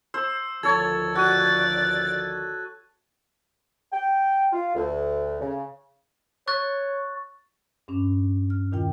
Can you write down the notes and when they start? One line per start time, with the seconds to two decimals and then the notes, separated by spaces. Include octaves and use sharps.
0.14 C5 E6
0.63 D2 D#3 F3 A4 C#5 G#6 A6
1.16 F#4 D5 F#6 A6 D#7
3.92 G5
4.53 F4
4.75 D2
5.40 C#3
6.48 C#5 C#6 F#6 A6
7.88 G2 C#4 D4
8.50 F6
8.71 E2 A#2 D#3 F4 G5